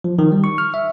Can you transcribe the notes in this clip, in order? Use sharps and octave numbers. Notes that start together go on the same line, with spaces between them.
F3
D#3
G3
C#6
F6
E5